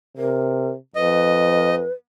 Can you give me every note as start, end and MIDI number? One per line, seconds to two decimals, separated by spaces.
0.17 0.76 48
0.17 0.69 70
0.95 1.86 41
0.95 1.92 71
0.95 1.75 75